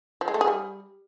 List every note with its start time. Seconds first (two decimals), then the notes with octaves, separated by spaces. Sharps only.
0.21 F3
0.28 G#3
0.34 A3
0.41 G#4
0.47 G3